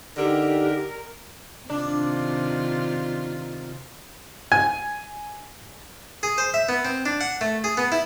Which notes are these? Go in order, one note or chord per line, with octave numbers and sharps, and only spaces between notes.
D3 D#4 G4 A#4
C3 D#3 D4 F4
G#5
G#4
C5
E5
B3
C4
D4
F#5
A3
G#4
B3
E4